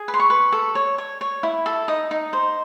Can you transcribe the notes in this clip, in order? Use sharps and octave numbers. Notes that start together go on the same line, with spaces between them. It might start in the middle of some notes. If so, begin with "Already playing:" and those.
Already playing: G#4
B4
C6
C#6
B4
A4
C#5
C#5
C#5
E4
A4
D#4 D#6
D#4
C5